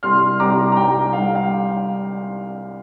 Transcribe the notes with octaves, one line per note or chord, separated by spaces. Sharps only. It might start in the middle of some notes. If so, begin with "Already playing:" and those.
C2 C6 F6
C2 A#5 D6
A#5
C2 G5
G3 F5
F5